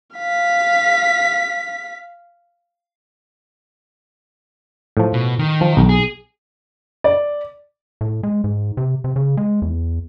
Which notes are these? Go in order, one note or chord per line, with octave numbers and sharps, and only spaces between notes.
F5 B6
A2 F3
B2
D#3
F3
B1
G#4
D5
A2
G#3
G#2
C3
C3
C#3
G#3
E2